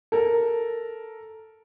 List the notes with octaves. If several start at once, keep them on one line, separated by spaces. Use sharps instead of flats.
A4 A#4